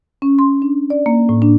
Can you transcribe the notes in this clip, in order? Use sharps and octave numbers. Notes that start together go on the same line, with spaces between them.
C#4
C6
D4
D5
A#3
A2
D4